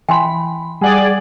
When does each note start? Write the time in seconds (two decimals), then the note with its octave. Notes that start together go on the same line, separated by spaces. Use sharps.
0.09 E3 G5 G#5 B5 C6
0.81 G3 G#4 D5 F#5 F#7